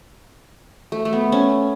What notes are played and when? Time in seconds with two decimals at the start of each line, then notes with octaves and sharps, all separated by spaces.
0.92 A3
1.05 A3
1.13 B3
1.32 C#4